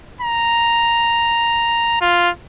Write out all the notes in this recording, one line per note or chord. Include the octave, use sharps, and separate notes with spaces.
A#5
F4